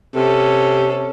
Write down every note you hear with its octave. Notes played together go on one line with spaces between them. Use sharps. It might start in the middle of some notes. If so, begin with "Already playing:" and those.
C3 C#4 A4